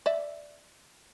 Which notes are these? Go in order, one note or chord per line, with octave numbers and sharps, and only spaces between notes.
D5 E5